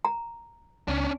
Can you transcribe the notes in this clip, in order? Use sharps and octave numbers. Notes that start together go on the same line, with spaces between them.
A#5
C#2 C#4 D4